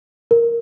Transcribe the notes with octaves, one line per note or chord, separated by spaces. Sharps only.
A#4